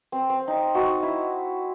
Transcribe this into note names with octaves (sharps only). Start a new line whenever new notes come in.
C4
C4
D#4
D#4 F#4
E4